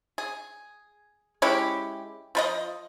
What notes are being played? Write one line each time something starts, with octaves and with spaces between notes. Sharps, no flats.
G#4
G#3 C#4 E4 G4
F3 B4 D#5